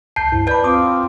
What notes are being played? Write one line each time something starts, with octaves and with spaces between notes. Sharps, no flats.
C#2 A5 G6 C7
D2 G2 E4
B4 D5 A5 B5 G6
C4 F4 C6 D6 D#6